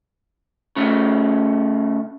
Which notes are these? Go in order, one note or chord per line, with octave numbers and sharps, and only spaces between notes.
C#3 A3